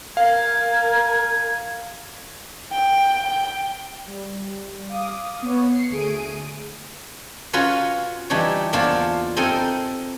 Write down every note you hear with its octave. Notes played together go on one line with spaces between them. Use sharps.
A#4 F5 G#5
G5
G5
G3
F5 D6 D#6
B3 C#5
C7 C#7
D2 A3 G#4 D7 D#7
C#4 F4 F#4 B4 C#5
E3 G3 D4 D#4 C#5
E2 A#2 D4 F4 C5 C#5
C4 D#4 A4 A#4 D#5 G#5